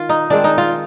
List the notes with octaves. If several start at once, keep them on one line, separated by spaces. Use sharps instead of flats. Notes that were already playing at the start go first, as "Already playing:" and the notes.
Already playing: D#3 F4
D#4
D#3 G#3 C4 D4
D#4
F4